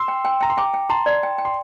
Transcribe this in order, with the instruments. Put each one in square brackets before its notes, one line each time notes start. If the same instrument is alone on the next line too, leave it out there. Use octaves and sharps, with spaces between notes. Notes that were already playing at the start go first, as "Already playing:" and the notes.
Already playing: [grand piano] C6 E6
[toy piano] G5
G5
[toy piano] G5 [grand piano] A#5
[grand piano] C6
[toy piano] G5 [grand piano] A#5 D6
[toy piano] G5
[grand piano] A5 C6 [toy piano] A#5
[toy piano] D5
G5
G5
[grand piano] C6